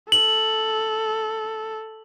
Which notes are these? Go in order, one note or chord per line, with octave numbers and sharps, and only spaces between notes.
A4 F#7